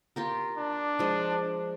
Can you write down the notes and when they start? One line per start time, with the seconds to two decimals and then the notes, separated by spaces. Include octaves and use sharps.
0.16 F4 G4 A#4
0.58 D4
0.99 F3 G#3 C5